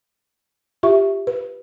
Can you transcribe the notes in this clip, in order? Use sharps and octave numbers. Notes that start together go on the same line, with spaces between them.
F4 G4 E5 C#6
B4